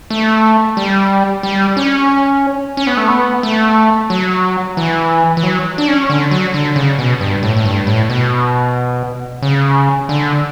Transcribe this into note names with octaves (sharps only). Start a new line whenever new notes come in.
A3
G3
G3
C#4
C#4
B3
A3
B3
A3
F#3
E3
E3
F#3
D4
C#4
D3
F#3
D3
C#3
B2
G2
A2
A2
G2
A2
B2
C#3
D3